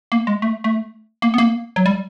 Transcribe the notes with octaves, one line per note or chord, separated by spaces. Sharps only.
A#3
G#3
A3
A3
A#3
B3
A#3
F#3
G3